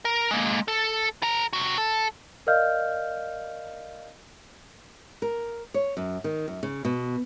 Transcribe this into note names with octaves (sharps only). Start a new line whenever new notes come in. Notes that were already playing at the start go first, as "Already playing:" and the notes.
A#4
G#3 A#3
A4
A4 A#5
C3 F#4
A4
A#4 D5 D#5 F5 F6 G6
A#4
C#5
F#2
D#3
F#2
C#3
B2